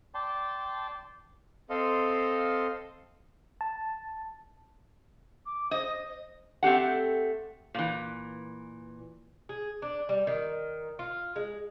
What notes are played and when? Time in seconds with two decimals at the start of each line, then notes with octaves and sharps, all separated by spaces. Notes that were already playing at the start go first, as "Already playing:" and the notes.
0.14 D5 G5 A5 C6
1.70 C4 A4 D#5 F5 C6
3.61 A5
5.46 D6
5.71 C5 D#5
6.63 A3 C4 G4 F#5
7.74 A#2 E3
9.49 G#4
9.82 D4
10.09 G3
10.27 D#3
10.99 F4
11.36 G#3